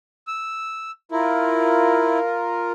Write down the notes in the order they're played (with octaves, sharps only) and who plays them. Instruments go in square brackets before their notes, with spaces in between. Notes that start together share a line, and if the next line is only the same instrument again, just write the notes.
[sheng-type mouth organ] E6
[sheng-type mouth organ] E4 [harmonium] F4 A#4